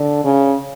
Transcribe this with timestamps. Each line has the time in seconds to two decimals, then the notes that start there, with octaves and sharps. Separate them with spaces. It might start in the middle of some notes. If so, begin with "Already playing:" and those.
Already playing: D3
0.24 C#3